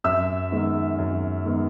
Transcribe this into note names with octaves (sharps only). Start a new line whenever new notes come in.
F#2 E5 E6
D#3 G#3 B3
F#2
D#3 G#3 B3